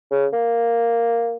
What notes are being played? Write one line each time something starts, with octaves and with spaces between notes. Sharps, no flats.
C#3
A#3